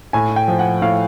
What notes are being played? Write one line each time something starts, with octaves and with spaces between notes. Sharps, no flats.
A2 G#5
G5
F3
F#5
A2 F5